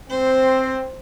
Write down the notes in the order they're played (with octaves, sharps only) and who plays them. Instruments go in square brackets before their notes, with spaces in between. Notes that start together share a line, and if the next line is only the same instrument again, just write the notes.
[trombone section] C4 [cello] C5